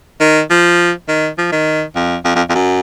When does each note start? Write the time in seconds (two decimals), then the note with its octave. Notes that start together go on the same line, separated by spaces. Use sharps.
0.21 D#3
0.50 F3
1.08 D#3
1.38 F3
1.52 D#3
1.95 F2
2.25 F2
2.36 F2
2.50 F2
2.55 F#2